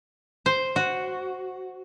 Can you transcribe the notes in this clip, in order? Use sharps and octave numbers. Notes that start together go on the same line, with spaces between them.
C5
F#4